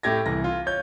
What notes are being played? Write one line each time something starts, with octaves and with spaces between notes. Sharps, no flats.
A2 A3 G4 G#6 A#6
C2 E3 A#6
F4
C#5 G6